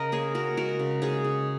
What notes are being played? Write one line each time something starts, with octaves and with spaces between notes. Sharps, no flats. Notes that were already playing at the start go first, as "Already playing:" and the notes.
Already playing: C#3 A#4 D#5
A#3 G#4 C#5
C#3 F#4 A#4
G#3 F#4 A#4
C#3
G#3 G#4 C#5
C#3